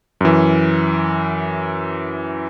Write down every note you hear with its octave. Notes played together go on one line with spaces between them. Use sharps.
F#2 E3